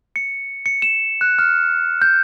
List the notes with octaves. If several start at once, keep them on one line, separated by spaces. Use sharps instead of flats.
C#7
C#7
E7
F#6
F6
G6